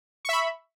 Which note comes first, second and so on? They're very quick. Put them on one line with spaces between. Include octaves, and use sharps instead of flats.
C#6 E5 B5